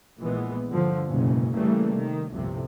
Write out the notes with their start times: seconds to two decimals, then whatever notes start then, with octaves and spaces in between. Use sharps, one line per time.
0.19 A#1 A#2 E3 G#3 B3
0.68 G2 D3 F3
1.08 F#1 B1 G#2 B2 C#4
1.55 C#3 E3 G3 A3 A#3
1.93 C3 D#3
2.31 G1 C2 F2 A2 C3